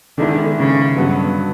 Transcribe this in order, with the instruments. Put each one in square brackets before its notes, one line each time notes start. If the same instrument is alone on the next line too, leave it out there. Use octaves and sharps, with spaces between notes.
[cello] D3 [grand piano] D#3 G#3 B3 E4
[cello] C#3
[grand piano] G2 D3 F#3 B3